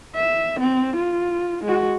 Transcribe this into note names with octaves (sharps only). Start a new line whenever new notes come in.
E5
C4
F4
G#3 F#4